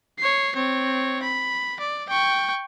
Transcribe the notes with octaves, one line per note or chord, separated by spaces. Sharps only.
C#5 C7
C4 C#5
B5
D5
G5 C#6